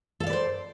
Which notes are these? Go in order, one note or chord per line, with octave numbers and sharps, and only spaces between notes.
A4 B4 C5 D5 F5